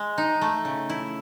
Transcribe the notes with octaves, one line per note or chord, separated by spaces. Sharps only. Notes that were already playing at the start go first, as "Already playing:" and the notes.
Already playing: G#3
D#4
A3
C#3
E4